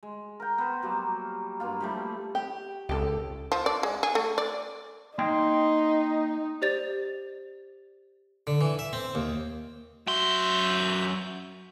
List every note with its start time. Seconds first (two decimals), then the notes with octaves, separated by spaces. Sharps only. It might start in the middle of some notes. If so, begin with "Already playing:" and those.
0.03 G#3
0.40 A#4 G5
0.58 B3 C5
0.82 F#3 G3 A#3
1.60 G2 F#3 A#3 F4
1.80 F3 G3 A3 E4
2.35 G4
2.89 C#2 G4 A4
3.52 F3
3.66 D5
3.83 G#3
4.03 G#4
4.15 A3
4.38 D5
5.19 A#3 D#4 D#5 G5 C6
6.62 G4 C5 D5 A6 F7
8.47 D3
8.61 E3
8.79 E5
8.93 C4
9.15 D#2
10.07 F#2 F#4 E5 C6 G6